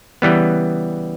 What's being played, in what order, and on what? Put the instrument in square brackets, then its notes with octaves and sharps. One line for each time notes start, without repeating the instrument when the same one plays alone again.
[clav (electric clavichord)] C#3 E3 G3 B3